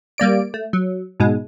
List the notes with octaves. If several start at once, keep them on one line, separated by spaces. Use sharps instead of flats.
G3 A#3 D5 D7
A3
F#3
G#2 B2 G#3